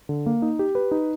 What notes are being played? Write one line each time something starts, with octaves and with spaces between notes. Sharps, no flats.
D3
A#3
D#4
G4
B4
D#4